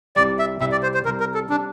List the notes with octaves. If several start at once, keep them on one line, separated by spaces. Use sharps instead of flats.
C2 C3 G3 D5
E5
C2 C3 G3 E5
D5
C5
C5
C2 C3 G3 A#4
A#4
A4
C3 G3 D4